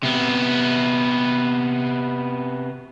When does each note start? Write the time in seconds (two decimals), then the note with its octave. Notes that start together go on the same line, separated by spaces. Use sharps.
0.03 C3 B3